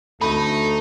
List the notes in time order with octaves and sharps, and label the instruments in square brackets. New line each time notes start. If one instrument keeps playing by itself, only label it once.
[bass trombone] D2 [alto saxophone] A3 [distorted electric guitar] D#4 [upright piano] B5